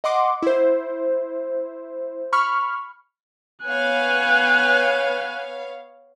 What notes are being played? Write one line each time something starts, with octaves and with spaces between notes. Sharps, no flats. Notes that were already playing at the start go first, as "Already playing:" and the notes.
D#5 F#5 C6 D6
E4 C5
B5 C#6 F6
B3 C#5 F5 G#5 F#6